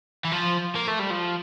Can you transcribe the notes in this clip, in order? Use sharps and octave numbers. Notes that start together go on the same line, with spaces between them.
E3
F3
A#3
A3
G3
F3